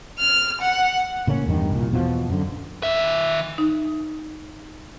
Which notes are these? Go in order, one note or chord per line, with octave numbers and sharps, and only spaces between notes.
F6
F#5
A2 C#3 A#3 C#4
E2 G2 D#3
C2 A#2
E2 B2 F3
F#2 D3
D#3 E5
D#4